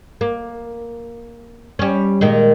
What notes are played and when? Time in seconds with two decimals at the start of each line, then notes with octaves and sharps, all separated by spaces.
0.21 A#3
1.79 G3 C#4
2.21 A#2 D#3 G#3